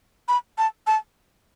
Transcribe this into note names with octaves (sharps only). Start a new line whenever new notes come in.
B5
A5
A5